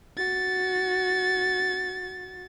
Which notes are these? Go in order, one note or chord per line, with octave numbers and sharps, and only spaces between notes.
F#4 A6